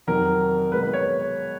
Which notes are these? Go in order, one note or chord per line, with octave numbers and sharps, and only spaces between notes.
F2 C3 D#3 F#3 A#4
B2 G#3 B4
B4
C#5